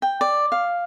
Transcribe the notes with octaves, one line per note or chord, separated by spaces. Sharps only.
G5
D5
F5